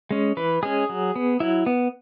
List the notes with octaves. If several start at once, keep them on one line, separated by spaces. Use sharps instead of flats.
G#3 C#4
E3 B4
G#3 C#4 G#4
F#3
B3
F#3 E4
B3